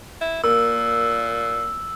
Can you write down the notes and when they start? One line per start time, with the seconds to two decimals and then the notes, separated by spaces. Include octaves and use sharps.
0.21 E4
0.44 A#2 A#3 E6